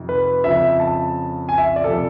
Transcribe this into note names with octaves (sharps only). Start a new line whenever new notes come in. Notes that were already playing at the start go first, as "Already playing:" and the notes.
Already playing: F2 C3 D#3
B4
F2 C#3 F3 E5
A5
G#5
E5
D5
F2 C3 F3 A4